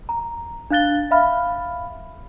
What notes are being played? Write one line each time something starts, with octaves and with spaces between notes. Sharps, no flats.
A#5
D4 F5 F#6 A6 G7
E5 F5 B5 F6